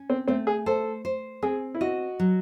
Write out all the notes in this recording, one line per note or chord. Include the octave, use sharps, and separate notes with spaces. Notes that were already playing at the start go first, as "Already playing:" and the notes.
Already playing: C#4
C4
A3 C4
G#4
A4 C5
C5
C4 G#4
E4
F#4 D#5
F#3